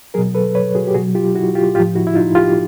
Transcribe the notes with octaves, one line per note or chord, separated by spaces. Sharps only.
B2 F#3 G#4 A#4
A4 B4
B4 C#5
F#4 G#4
G4
B2 F#3 F#4 G#4
F4 G4
E4 F#4
F4 G4
A2 F3 F4 G4
E4 F#4
E4
D#4 F4
F4 G4